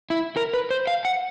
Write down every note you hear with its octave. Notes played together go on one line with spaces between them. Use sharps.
E4
A#4
B4
C5
F5
F#5